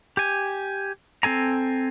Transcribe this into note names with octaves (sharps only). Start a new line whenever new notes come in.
G4 G#5
C4 A4 G#5 A#5